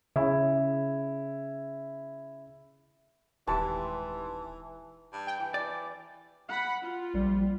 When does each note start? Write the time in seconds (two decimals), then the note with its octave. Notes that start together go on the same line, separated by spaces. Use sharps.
0.16 C#3 E4
3.47 D#1 G#1 E3 G4 A5 C6
5.12 G2
5.27 G5
5.39 E3
5.54 D5
6.49 F#5 B5
6.82 F4
7.14 A#1 G3